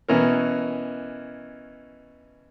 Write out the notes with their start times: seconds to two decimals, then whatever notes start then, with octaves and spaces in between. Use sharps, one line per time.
0.09 B2 E3 C#4 A#4